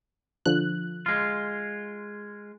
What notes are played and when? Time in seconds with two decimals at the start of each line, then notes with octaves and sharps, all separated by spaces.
0.46 D3 F3 F#6
1.06 G#3 F4